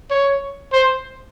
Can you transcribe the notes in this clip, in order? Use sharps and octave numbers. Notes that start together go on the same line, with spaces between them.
C#5
C5